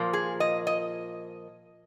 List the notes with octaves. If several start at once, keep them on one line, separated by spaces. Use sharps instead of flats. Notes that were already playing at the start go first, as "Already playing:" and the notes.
Already playing: A#2 F3 A#3
G#4
D#5
D#5